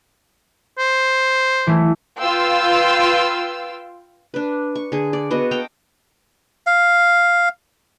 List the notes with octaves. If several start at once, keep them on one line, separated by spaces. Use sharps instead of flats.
C5
E3 A3
F4 B4 F5 G5 C6 E6
D4 B4
C#6
D3 G#4
D5
B3 F#4 D#5
A4 F5 G5 A#5
F5